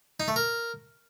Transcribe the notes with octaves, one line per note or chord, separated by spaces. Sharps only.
D#4
A3
A#4